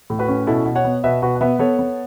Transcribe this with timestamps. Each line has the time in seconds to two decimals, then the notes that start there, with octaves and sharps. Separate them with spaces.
0.10 A2
0.19 F#4 B4
0.28 C#4
0.47 B2 E4 A4
0.66 B2
0.75 C#5 F#5
0.85 B3
1.04 B2 B4 E5
1.22 B2 F#4 B4
1.35 F#5
1.41 B3 B4 E5
1.59 B3 A4 C#5
1.79 B3